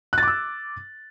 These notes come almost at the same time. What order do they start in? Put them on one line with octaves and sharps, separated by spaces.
F#6 A6 D6 E6